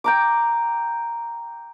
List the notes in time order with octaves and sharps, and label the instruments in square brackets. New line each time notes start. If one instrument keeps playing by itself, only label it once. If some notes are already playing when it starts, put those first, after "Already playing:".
[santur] G5 A#5 D6